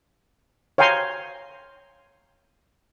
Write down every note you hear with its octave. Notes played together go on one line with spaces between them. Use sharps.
C#5 F5 G5 G#5 A#5 C6